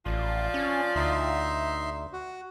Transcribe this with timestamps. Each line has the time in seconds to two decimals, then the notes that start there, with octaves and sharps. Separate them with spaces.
0.06 A1 F3 F4 D5
0.54 C#4
0.95 D2 D#4 E5 C6
2.13 F#4